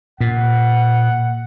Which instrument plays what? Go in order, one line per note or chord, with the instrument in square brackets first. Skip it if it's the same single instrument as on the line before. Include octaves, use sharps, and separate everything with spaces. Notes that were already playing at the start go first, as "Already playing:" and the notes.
[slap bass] A#2 [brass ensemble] F#5